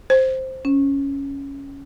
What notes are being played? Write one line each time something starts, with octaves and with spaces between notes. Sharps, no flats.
C5
C#4